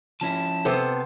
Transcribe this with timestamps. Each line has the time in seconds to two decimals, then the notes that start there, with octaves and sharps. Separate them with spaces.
0.21 F3 C#4 E4 A5
0.65 C3 B3 A4 C5